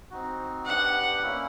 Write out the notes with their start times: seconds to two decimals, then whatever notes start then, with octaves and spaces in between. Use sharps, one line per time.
0.10 C4 D#4 F#4
0.66 B3 D4 G4 F#5
1.22 A#3 C#4 E4